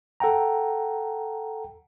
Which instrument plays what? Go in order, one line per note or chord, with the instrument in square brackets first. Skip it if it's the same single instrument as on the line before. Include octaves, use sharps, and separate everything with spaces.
[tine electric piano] A4 F#5 G5 A#5